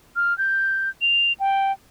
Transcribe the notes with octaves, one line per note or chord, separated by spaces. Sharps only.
F6
G6
F7
G5